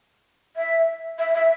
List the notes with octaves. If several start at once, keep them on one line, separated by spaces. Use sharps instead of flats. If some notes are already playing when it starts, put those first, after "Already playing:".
E5
E5
E5